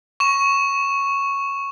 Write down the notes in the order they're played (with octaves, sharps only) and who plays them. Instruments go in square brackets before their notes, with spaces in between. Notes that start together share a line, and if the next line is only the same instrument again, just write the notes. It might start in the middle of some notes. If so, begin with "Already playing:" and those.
[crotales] C#6 E7